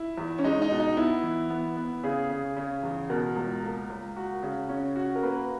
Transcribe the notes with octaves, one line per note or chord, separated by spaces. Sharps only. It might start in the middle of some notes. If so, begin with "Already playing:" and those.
Already playing: E4
E2
C#4
G#3 D#4
D#4
B2
D#4
B3 E4
E3
B3
B3
C#3 G#4
C#3
C#3
E2
B2 A#4
C#2
A#3
C#2
F#4
C#3
C#4
F#4
A#4
A#3 B4